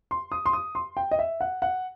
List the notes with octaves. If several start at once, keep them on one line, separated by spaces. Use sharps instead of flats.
C6
D#6
C6
D#6
C6
G5
D#5
E5
F#5
F#5